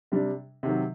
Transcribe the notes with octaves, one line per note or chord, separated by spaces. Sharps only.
C3 G3 D4
C3 D#3 F#3